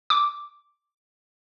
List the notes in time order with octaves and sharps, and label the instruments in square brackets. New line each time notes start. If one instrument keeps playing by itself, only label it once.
[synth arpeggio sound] D6